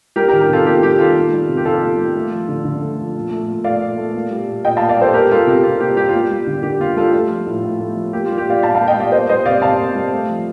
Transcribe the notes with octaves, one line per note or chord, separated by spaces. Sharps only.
G3 G4 A#4
G4 A#4
D#3
G4 A#4
C3 F4 A4
A#3 G4
G3 G4
D#3 F4 A4
A#3
G3
C3
G4
C3 F4 A4
A#3
G3
A3
F3
D3
D3
A3
F3
A#2
A3
A#2
A3 D5 F5
A#2
A3
A#3
G3
A#2
A#2 D#5 G5
A#3 F5 A5
D5 F5
G3 A4 C5
A#3 G4 A#4
G3 F4 A4
C3 G4
C3 F4
A#3 G4
G3 G4
F4
A#3 G4
G3
D3
D3 G4
A#3 F4
G3 F4 A4
A3 F4 A4
F3
A2
A2
A3
F3
A#3 G4
G3 F4
G4
A#2 D5 F5
A#2 F5 A5
A#3 F5 A5
D#5 G5
G3 D5 F5
A#3 C5 D#5
G3 C5 D#5
C3 D5 F5
C3 F5 A5
A#3
G3
A3
F3